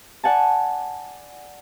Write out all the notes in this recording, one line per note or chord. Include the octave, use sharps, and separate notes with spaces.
D5 F#5 G#5 A5